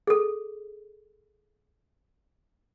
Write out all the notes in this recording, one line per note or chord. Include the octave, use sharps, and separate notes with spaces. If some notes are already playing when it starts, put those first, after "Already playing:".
G#4 A4